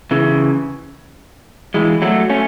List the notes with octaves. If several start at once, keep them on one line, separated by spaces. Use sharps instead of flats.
C#3 E3
E3 G#3
F#3 A3
A3 C#4